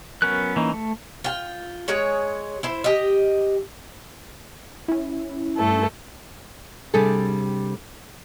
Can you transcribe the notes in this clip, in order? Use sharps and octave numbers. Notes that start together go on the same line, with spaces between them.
F#3 B3 C#4 A#4 F#6
E3 A#3 C#4 D#4
A3
F4 G5
G#3 G#4 C#5
E4 C5
G4 D#5
C#4 E4
G2 A3 A4
C3 G3 D4 G#4 A4